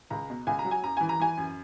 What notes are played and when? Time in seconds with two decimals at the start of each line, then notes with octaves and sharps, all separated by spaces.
0.10 C#2 A#5
0.30 B2
0.47 C#2 G#5
0.59 A#5
0.65 F#3
0.71 G#5
0.83 F#2 A#5
0.97 E3 G#5
1.09 A#5
1.20 E3 G#5
1.37 F#2